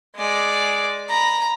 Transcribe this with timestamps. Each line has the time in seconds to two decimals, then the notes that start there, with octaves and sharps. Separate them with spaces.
0.16 G#3 D5
1.09 A#5 B5